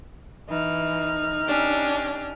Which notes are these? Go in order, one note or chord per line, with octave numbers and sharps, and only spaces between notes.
E3 D#4 F6
C#4 D4 G4